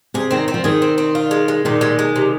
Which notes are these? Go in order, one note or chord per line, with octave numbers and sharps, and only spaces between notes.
C3 G#4
D#3 C4
C4
F3
D#3 G#4
C4
C4
F4
G#3
G#3
A#2 D#3
G#3
G#3
C3